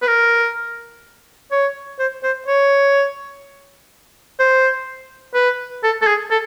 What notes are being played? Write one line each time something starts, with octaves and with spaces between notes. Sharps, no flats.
B4
A#4
C#5
C5
C5
C#5
C5
B4
A4
A4
G#4
A4